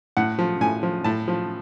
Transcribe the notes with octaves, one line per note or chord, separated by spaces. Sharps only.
A2 F#5
F3
A2 G#5
F3
A2 A5
F3